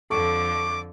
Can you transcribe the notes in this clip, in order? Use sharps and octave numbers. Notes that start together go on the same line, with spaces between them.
F2 D3 A4 C#6 D6